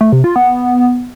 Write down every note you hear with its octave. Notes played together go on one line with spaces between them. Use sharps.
A3
C3
F4
B3